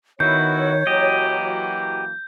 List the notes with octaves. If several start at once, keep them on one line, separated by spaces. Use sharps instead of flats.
D#3 B3 E4 F#4 C#5 G6
E3 F#3 A#3 G4 D#5